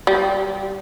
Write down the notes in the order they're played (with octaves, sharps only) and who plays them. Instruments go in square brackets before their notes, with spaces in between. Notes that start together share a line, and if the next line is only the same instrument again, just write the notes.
[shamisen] G3